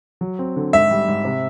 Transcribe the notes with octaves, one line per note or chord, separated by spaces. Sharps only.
F#3
C4
D3
G#2 E5
G3
G#2
C3